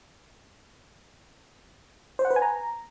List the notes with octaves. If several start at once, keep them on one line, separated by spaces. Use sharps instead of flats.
C5
F#5
B4
G#5
A#5